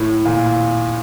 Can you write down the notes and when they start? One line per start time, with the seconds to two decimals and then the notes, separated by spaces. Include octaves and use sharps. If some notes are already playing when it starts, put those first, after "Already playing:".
Already playing: A2
0.25 A#2